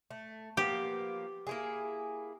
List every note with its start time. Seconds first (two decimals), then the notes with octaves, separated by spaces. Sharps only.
0.11 A3
0.57 F3 A#3 B3 G4
1.47 A#3 E4 G#4